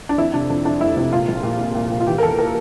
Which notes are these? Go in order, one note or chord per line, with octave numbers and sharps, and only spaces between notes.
D4
F2 E4
C3 D4
F2 D4
F2 D4
F1 E4
C3 E4
A#2 F4
A#1
A#2
A#2
A#2
A#2
F4
E3 G4
A#4
E2 A4
A#4